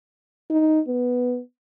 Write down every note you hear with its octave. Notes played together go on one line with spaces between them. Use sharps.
D#4
B3